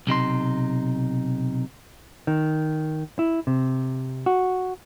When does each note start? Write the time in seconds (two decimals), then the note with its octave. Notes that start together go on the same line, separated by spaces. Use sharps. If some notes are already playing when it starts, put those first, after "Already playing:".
0.07 B1 C3 D#4 C6
2.27 D#3
3.19 E4
3.47 C3
4.26 F#4